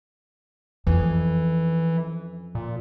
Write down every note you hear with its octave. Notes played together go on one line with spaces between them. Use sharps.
F2 E3 C#4
A#2